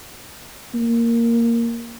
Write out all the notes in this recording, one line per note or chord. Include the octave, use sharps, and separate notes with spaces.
A#3